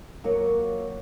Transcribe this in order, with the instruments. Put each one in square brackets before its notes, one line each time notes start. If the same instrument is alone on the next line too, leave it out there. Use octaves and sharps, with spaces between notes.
[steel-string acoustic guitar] F#3 A#3 F4 F#4 C#5